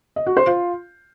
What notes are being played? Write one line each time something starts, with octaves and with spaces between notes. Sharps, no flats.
D#5
F#4
C5
F4